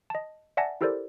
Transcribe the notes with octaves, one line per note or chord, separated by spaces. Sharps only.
D#5 A5
D5 E5 F#5 G#5 A5 A#6
E4 G4 A4 A#4 C5 D5